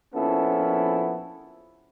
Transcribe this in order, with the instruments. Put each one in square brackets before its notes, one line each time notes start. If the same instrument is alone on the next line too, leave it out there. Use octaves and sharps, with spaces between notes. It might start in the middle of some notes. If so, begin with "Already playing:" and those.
[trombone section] A#1 F3 B3 C#4 E4 A4